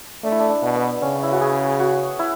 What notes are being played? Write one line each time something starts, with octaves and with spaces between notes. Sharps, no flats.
A3 D4
E4
D4
D4
B2
B3
C#3 C#4
E4
F#4
G#4
F#4
E4